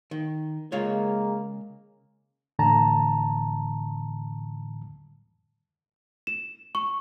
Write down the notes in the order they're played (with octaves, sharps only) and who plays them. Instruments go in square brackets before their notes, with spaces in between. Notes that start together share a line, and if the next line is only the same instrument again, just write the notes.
[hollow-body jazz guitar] D#3
[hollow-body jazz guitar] C#3 F4 C#5 [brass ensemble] G#3 A#3
[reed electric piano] F2 A2 D3 E3 A5 A#5
[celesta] E7
C#6